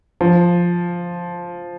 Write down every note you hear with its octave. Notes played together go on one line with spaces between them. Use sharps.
F3